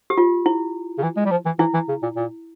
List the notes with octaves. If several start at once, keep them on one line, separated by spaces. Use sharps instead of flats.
G4
F4
E4
C#3
E3
G#3
G3
F3
E3
E3 E4
E3
C#3
A#2
A#2